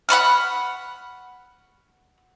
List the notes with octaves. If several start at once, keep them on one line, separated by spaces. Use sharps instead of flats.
F#5 B5 C#6 F6